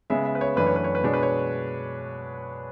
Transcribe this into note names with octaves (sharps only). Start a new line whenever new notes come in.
C#3 G#3 B3 E5
E5
B4
C#5
F#2 E3 A3 D4 B4
C#5
B4
C#5
B4
B2 G#3 D4 C#5
B4
C#5